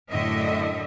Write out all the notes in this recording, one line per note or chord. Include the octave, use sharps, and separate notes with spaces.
F#2 A2 D3 D#5 E5